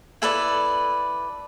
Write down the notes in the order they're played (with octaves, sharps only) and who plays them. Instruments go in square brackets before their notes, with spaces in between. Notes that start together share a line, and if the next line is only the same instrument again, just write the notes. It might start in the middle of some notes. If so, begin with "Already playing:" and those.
[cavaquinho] E4 A4 B4 D5